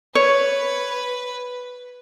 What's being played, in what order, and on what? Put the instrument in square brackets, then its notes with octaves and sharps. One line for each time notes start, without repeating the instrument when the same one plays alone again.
[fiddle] B4 [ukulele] C#5